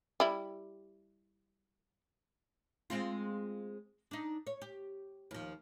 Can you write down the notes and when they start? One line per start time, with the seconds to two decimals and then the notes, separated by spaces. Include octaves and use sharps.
0.20 G3 E4
2.90 G#3 C4 F4
4.11 D4 D#4
4.47 C#5
4.62 G4
5.31 D#2 F3